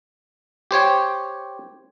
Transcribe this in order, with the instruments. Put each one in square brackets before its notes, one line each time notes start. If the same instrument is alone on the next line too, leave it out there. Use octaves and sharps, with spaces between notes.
[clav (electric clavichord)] G4 C5 C#5 G5